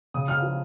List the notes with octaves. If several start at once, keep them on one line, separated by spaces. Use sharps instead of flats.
C#3 D#6
C#3 F6
F3